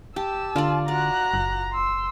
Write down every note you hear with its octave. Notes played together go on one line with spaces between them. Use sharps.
G4 A5 E6
D3 F4 D5
F#4 D5 A#5 F#6
F#1
C6 E6